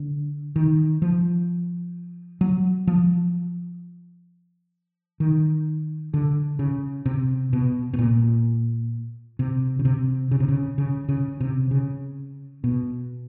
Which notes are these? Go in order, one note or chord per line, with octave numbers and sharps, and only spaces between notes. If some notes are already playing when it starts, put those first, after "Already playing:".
Already playing: D3
D#3
F3
F#3
F3
D#3
D3
C#3
C3
B2
B2
A#2
C3
C#3
C3
C#3
C3
C#3
C#3
C#3
C3
C#3
B2